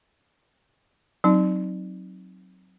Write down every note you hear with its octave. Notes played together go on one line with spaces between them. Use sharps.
F#3 C4 D#4